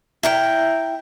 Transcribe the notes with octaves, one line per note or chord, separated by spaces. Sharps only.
E4 A#4 G5